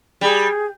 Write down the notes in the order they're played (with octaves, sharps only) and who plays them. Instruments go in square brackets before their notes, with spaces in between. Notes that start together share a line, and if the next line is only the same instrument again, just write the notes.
[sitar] G3 [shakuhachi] G#4